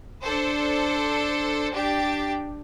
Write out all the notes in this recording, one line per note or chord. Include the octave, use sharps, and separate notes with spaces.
D4 A4 C5
D4 G4 G5 A6